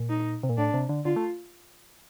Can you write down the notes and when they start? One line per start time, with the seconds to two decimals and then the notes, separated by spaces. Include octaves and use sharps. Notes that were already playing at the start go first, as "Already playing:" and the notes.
Already playing: A#2
0.10 D#4
0.43 C3
0.49 A#2
0.57 A2 D4
0.74 C3
0.89 D3
1.05 D3 F4
1.16 A3